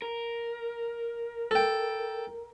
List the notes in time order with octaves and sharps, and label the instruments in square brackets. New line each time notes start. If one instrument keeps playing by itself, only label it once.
[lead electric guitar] A#4
[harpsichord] A4 G5